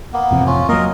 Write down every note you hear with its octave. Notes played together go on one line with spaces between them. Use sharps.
A#3 B3
A1 F2 C3
C#4 F4
F#3 A#3 A#4 D#5